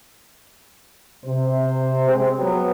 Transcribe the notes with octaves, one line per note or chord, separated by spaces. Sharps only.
C3 C5
G#3 C4
F#3 B3